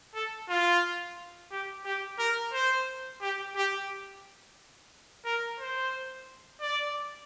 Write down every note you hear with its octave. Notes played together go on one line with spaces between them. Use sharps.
A4
F4
G4
G4
A#4
C5
G4
G4
A#4
C5
D5